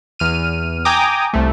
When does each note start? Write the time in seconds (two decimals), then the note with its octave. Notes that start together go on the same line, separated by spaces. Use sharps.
0.19 E2 F6 D#7
0.85 G5 G#5 A#5 D6 D#6
1.33 C2 A3